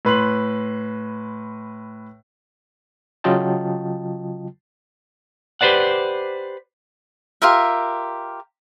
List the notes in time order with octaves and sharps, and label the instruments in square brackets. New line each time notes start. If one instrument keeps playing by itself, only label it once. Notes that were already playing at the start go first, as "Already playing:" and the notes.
[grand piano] A2 B4 C6 F#7
[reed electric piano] C#3 F#3 F4 D#5 G5 A5
[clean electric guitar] G4 B4 C5 D5 F#5
[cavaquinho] F4 G4 A#4 E5